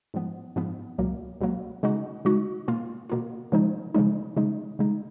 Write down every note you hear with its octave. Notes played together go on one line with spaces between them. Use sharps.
G#2 F3 B3
G#2 F3 B3
C#2 B2 F#3 A#3
C#2 B2 F#3 A#3
C#3 G#3 D#4 F#4
C#3 G#3 D#4 F#4
B2 A#3 F4
B2 A#3 F4
C#3 F3 G#3 D#4
C#3 F3 G#3 D#4
C#3 G#3 D#4
C#3 G#3 D#4